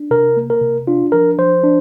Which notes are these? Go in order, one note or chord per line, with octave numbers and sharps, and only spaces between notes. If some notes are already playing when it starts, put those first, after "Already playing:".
Already playing: D4
C3 A#4
A#3
A#4
C3
D4 F4
F3 A#4
F3 C5
D4